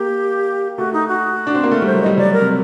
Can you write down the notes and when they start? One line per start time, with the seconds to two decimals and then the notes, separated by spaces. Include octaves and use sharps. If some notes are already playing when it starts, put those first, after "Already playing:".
Already playing: A#3 G4
0.77 A3 F#4
0.93 D#4
1.09 F#4
1.47 D4
1.55 C4
1.63 A#3
1.71 A3 A#4
1.82 G3
1.86 C5
1.95 F#3
2.02 G3 D#5
2.18 F#3 D5
2.34 A#4
2.41 C3